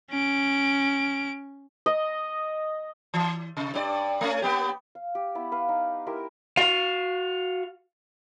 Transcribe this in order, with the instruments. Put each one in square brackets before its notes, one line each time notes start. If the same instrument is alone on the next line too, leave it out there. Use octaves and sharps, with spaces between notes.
[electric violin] C#4 D7
[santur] D#5
[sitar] E3
C3
G2 D4 D5
A3 C#4
A#3 B3 G4
[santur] F5
G4
B3 E4
B4 F5
D#4
E4 G4 A#4 C6
[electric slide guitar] F#4 F5